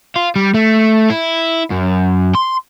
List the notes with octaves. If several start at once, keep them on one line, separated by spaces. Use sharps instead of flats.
F4
G3
A3
E4
F#2
C6